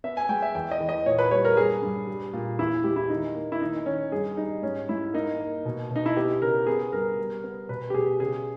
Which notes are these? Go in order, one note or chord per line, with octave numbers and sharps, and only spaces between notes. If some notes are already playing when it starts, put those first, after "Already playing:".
B3 E5
G#5
G#3 G5
E5
E2 G5
D#5
E3
D#5
A#2 C#5
B4
G3 C#5
A#4
G2 G#4
G2
G3
A#2
E2 E4
G#3 G4
E4
D#3 D#4
A#3
E4
D#3 D#4
D#3 C#4
G2 G#4
G3 D#4
G#2 C#4
G#2 E4
A#3 D#4
A#3
B2
B2
D#4
E4
B3 G4
C#3 A#4
B3 G#4
G2 A#4
G3
B3
B2 B4
G4
B2 G#4
C#3 G#4